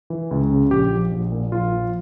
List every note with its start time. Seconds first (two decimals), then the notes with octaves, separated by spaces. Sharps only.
0.10 E3
0.31 C#2
0.51 C#3
0.71 A#1 G4
0.91 F3
1.12 A#1
1.32 A#2
1.52 A#1 F4
1.72 F3